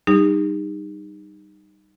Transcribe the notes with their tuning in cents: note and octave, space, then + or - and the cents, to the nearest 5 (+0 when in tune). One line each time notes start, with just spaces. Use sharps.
G3 -20 D#4 -15 G4 +45